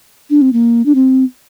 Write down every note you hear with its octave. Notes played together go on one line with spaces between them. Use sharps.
D4
C4
A#3
D4
C4